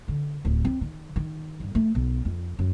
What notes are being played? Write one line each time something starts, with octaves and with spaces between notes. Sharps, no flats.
D3
D1
C4
D#3
D#3
G2
A3
B1
F2
F#2